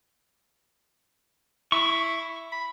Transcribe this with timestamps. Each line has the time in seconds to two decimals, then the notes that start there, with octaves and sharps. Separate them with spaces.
1.72 E4 C#6
2.52 B5